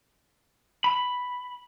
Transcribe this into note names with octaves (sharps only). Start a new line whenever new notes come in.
B5